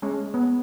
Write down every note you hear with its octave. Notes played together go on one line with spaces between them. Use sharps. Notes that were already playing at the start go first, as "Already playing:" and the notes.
G#3 C#4
B3